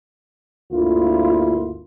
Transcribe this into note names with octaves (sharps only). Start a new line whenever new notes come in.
G1 D2 A#3 E4 F4